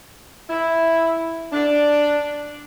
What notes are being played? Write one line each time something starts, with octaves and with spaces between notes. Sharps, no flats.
E4
D4